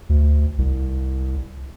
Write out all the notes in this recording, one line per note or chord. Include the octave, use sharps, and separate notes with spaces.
D2
C2